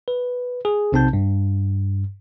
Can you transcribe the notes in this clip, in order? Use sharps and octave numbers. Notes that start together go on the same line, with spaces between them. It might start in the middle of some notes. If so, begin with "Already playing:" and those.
B4
G#4
B1 C3 C4 D#4 A5 G6
G2